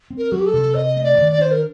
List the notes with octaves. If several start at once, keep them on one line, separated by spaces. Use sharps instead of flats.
C4
A#4
F#3 F#4
G4
A4
C3
C3 D#5
A3
D5
D#3
D5
D4 C5
A#4